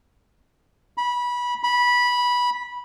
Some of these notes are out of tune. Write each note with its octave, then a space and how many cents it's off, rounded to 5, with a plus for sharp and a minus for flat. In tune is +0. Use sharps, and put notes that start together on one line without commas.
B5 -20
B5 -15